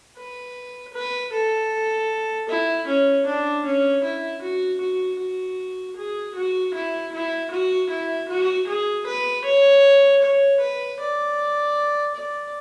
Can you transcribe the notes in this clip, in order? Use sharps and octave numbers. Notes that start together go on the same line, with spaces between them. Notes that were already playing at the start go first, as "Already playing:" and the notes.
B4
B4
A4
E4
C#4
D4
C#4
E4
F#4
F#4
F#4
G#4
F#4
E4
E4
F#4
E4
F#4
G#4
B4
C#5
C#5
B4
D5
D5